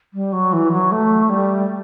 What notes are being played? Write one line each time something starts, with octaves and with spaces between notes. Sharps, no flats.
G3
F#3
E3
F#3
A3
G3